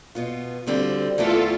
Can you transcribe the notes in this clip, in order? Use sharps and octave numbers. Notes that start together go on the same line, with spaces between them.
B2 B3 F4
D2 D3 G3 C4 F4
E2 D3 A3 E4 F4 A4